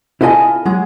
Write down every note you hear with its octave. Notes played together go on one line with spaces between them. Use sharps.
E4 F4 A4 D#5 G#5
F#3 G#3 G#4